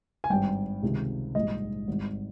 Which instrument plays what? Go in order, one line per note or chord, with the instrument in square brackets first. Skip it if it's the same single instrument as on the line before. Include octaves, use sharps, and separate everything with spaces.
[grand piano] G#5
G#1 G2 G3 G5
C#2 C3 D#3
A#1 G#2 G3 D#5
G#1 G#2 G3